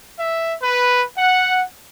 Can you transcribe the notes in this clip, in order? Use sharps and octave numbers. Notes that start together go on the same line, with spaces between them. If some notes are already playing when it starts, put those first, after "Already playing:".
E5
B4
F#5